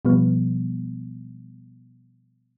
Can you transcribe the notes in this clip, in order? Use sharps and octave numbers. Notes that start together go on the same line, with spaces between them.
B2 F3 G3 B3